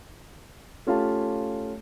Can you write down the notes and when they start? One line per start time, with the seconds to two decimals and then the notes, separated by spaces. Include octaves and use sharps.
0.87 A3 C#4 F4 G4 F5 A5